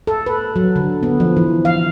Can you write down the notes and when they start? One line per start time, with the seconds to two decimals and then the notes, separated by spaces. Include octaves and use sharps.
0.07 A4
0.26 B4
0.56 F#3
0.76 D3
1.03 B3
1.20 F3
1.37 E3
1.65 F5